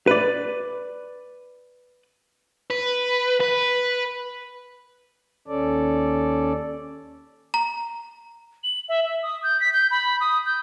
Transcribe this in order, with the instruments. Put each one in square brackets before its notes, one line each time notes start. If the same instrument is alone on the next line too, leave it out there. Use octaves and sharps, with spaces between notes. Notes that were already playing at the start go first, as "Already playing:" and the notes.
[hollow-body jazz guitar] B4 D5
[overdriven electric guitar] B4
B4
[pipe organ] D#2 C#4 A4 D5
[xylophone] A#5
[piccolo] F#7
E5
E5
D#6
G6
B6
G6
B5
D#6
G6